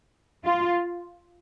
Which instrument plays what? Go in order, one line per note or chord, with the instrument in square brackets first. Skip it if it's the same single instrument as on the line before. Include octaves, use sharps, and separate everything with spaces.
[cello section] F4